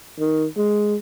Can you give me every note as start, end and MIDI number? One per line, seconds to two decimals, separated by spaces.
0.19 0.45 51
0.57 0.95 56